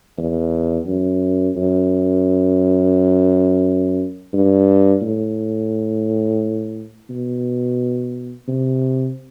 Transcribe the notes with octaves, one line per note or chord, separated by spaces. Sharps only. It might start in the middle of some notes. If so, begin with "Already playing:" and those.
E2
F#2
F#2
G2
A2
B2
C3